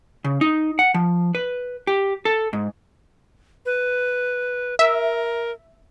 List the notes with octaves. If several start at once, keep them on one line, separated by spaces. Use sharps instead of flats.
C#3
D#4
F#5
F3
B4
G4
A4
G#2
B4
A#4 E5